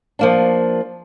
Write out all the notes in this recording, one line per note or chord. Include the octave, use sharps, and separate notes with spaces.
F3 A#3 D4